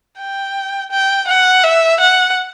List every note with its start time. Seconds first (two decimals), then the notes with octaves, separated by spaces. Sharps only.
0.18 G5
0.91 G5
1.28 F#5
1.64 E5
2.00 F#5